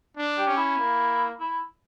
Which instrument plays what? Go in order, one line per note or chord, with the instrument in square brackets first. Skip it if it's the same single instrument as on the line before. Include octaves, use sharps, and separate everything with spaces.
[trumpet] D4
[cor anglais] G4
[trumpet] C#4
[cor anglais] E4
[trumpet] A#3
[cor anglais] E4